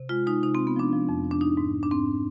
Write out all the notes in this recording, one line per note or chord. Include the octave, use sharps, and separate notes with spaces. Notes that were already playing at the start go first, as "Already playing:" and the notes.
Already playing: C3
G#3 F4
G#3 D#4
C3 D#4
G#3 C4
B3
F3 D4
F3
F2
F3
D4
G#2 D#4
G#2
G#2
D4
G#2 C4